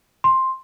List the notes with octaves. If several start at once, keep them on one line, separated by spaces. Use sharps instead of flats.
C6